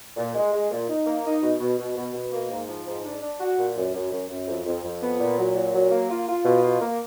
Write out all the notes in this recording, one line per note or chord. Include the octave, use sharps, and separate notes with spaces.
A#2
G#3
G#3
A#2
D#4
A#3
D#4
B2
B2
B2
B2
B2
A#3
G#2
F3
G#2
D4
D4
F#4
A#2
F#2
F#2
F#2
F#2
F2
F2
F2
B3
A#2
F#3
A#2
F#3
A#3
F4
F4
B2
F4
A#3